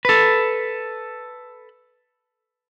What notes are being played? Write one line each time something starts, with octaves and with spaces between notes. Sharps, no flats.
A4 B4